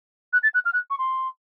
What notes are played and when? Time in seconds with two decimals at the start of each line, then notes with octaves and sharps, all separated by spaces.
0.33 F#6
0.43 A6
0.54 F#6
0.65 F6
0.73 F#6
0.90 C#6
0.99 C6